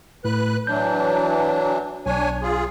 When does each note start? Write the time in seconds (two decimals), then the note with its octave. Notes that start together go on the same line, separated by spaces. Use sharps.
0.25 A2 B4 F#6
0.67 E3 F#3 D4 G6
2.06 B1 D4 C#5 G#5
2.42 F4 G#4